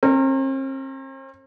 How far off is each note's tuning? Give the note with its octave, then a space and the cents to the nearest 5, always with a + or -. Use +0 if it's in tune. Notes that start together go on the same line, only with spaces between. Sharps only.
C4 +45 A#4 -25